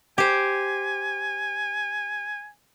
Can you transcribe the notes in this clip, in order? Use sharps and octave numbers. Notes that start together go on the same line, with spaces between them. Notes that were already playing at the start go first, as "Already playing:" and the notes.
G4 C5 G#5